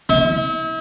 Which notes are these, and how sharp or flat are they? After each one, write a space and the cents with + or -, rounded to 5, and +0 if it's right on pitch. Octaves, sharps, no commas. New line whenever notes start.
E4 -40